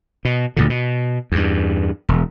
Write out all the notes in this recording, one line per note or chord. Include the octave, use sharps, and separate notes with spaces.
B2
D2 A#2 D3
B2
E2 G2
E1